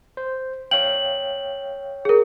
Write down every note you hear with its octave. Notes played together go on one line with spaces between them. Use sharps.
C5
C#5 F5 G5 F#7
G#4 A#4